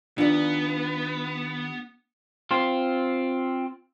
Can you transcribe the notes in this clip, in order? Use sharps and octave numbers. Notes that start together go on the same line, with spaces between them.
D#2 B3 D4 F4 D5
C4 F4